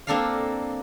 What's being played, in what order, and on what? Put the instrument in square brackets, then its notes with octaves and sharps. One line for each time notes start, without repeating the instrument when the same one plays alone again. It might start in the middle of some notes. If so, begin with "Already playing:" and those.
[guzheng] A#3 C4 D4 A4 A#4 F5